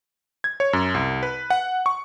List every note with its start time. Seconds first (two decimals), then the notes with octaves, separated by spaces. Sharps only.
0.44 G#6
0.60 C#5
0.73 F#2
0.94 C2
1.23 B4
1.50 F#5
1.86 C#6